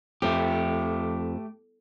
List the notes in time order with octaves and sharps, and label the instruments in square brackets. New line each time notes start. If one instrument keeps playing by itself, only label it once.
[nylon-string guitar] F2 [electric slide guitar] A3 G4